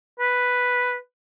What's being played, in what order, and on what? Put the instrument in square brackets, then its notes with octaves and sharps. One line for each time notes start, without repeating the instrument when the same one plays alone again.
[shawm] B4